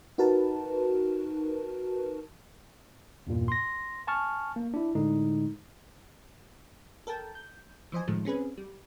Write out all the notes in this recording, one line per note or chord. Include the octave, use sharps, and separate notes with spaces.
D#4 F#4 A#4 B4 A5
E2 G2 A#2
C6 A#6
G#5 A5 C#6 F6
A#3
D4 E4
A2 D3 G#3 D#4
A4 A#4 G5 A5
G6
E3 F3 C5 D#5 G#5
A2 D#3 F3 G#3 A3
C4 C#4 G#4 B4
G3